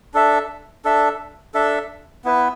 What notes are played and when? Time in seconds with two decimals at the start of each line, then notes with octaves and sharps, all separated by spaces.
0.14 D4 A4 E5
0.85 D4 A4 E5
1.54 D4 A4 E5
2.24 B3 E4 B4